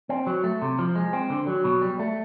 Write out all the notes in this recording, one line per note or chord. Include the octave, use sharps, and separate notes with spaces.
C4
F#3
A3
C3
F3
G#3
C4
D3
F#3
B2
G3
A3